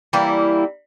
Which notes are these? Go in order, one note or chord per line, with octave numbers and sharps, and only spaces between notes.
E3 G3 A#3 E4